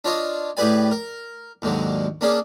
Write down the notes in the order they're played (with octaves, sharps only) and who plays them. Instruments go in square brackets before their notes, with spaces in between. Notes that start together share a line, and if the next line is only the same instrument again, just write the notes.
[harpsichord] D4 F4 C#5 D#5
A2 G4 G#4 B4 D5 G#5
A#4
D#2 G#2 D3 F#3
A#3 C#4 D4 G#4